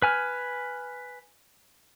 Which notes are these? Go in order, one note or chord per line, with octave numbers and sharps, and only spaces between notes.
B4 G#5 F6